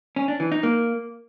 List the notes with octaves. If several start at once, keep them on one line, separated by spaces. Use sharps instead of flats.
C#4
D4
E3
D#4
A#3